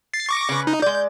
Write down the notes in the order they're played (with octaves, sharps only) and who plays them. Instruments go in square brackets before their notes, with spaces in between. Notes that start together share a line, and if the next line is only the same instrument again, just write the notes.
[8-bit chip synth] A6 C7
C#6 D6 A#6
[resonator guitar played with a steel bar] C#3 B4
[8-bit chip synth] D#4
[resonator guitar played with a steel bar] G#3 D5 [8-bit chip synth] G6